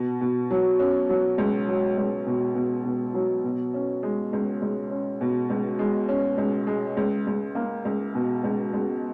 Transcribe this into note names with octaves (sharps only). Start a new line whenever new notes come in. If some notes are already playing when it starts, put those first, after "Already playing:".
Already playing: B2
B2
F#3
C#4
F#3
C#2
F#3
C#2
B2
B2
B2
F#3
B2
C#4
G#3
C#2
C#2
C#4
B2
C#2
G#3
C#4
C#2
G#3
C#2
C#2
A#3
C#2
B2
C#2
C#2